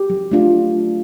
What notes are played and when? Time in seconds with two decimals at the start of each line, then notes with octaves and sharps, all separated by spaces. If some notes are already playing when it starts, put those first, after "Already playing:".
Already playing: G4
0.10 F#3
0.31 A3 D4 F4